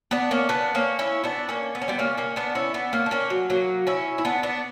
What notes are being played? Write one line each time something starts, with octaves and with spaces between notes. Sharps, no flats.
B3 D4
A#3 C#4
B3 D4
A#3 C#4
C#4 E4
B3 D4
A#3 C#4
B3
C#4
G3 B3
A#3 C#4
A#3 C#4
B3 D4
C#4 E4
B3 D4
A#3 C#4
D4
A#3 C#4
F#3
F#3 A#3
C#4 E4
E4
B3 D4
B3 D4